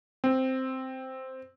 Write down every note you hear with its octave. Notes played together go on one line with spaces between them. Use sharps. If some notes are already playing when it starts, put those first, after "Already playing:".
C4